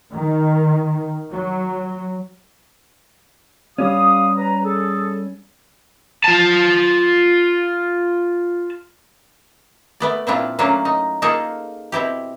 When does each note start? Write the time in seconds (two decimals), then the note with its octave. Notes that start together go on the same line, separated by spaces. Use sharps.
0.12 D#3
1.30 F#3
3.78 G3 C#4 G4 F5 D#6
4.37 B4 A#5
4.64 G#4 A4
6.24 F4 A5
10.00 A3 B3 D5
10.27 A#2 F3 C4 D4 E4 F4
10.59 A2 F#3 A#3 C#4 D4
10.85 D#4
11.22 A#3 D#4 F4 G#4 A4
11.92 B2 C4 E4 G4